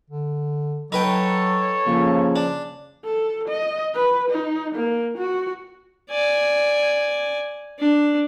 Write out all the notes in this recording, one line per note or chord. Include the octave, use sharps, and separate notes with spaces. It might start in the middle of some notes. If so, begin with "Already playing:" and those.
D3
F#3 D#4 A4 B4 C#5 G5
C#3 F3 A#3
D4
A4
D#5
B4
D#4
A#3
F#4
D5 G#5
D4